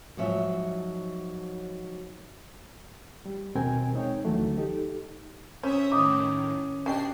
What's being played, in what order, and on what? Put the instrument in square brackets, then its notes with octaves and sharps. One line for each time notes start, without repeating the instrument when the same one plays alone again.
[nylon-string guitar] G#2 F3 F#3 E5
[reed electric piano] G3
D#2 B2 C4 A#4 G5 G#5
G#3 C4 D#4 C#5 G5
D2 D3 E3 F#3 A3
D#4 G4 A4
[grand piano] C#4 [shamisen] C5 [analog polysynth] E5 D#6
[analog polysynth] A2 D#3 [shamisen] D#4 [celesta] D6 D#6
[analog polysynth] B2 D4 C7 [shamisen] C#4 G4 D#5